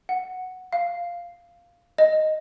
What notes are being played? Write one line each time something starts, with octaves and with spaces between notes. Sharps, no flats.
F#5
F5
D#5